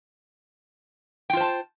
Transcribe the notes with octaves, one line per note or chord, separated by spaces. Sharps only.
F4 C5 G5 A5